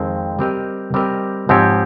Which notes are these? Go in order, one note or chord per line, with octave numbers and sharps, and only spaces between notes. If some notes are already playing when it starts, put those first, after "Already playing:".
Already playing: F2 D#3 G#3 C4
G3 C4 G4 A#4 D#5
G3 C4 G4 A#4 D#5
G#2 F3 C4 G4 C#5